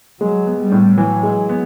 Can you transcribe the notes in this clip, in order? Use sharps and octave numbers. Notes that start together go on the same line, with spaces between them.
F#3 G#3
B3
G3
A2
E3 F#3
G#3
B3